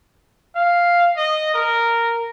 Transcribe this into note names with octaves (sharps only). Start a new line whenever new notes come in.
F5
D#5
A#4